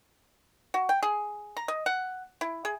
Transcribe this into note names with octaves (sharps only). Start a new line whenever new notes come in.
F#4
G5
G#4
A#5
D#5
F#5
E4
G#4